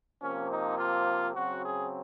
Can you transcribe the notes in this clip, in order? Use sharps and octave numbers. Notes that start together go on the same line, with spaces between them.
C3 F3 A#3 C#4
D#4
F4
C#3 F#3 C4 F#4
G#4